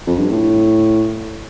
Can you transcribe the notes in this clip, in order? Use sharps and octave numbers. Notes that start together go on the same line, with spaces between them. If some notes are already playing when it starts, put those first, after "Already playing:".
F2
G2
A2